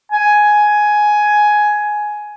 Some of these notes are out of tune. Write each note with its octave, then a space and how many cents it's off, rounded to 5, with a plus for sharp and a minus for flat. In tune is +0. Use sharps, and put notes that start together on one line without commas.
G#5 +10